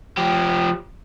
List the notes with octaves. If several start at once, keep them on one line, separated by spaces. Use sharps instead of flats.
F3 G4